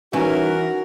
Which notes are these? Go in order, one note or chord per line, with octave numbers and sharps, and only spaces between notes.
E3 C#4 D#4 F#4 A#4